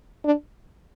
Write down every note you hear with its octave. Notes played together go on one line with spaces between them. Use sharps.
D4